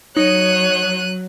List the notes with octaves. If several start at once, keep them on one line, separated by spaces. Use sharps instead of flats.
F#3 D#4 C#5 F#6 D#7